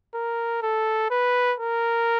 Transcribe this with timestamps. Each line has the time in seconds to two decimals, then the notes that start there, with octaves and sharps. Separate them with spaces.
0.14 A#4
0.63 A4
1.11 B4
1.60 A#4